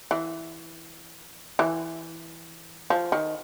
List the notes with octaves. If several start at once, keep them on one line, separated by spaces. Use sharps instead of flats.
E3
E3
F3
D#3